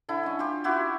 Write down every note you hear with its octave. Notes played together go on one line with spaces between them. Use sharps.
D3 E4
C#4 D#5
F4 G4
E4 F#4 G4